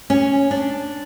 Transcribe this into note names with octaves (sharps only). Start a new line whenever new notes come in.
C#4
D4